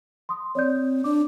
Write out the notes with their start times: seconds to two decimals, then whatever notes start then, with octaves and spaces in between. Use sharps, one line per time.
0.29 C6 D#6
0.55 C4 C#5 D5 G6
1.04 D4 D5 D6